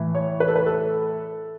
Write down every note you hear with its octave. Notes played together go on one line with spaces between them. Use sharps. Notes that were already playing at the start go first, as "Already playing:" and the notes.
Already playing: A2 E3
C#5
B4
A4
B4
A4